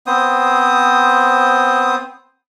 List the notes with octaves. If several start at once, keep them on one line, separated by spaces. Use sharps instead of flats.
B3 C4 C5 D#6